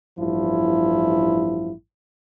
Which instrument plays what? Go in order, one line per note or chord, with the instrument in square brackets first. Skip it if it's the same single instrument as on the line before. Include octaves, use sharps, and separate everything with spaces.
[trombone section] A1 G2 F3 E4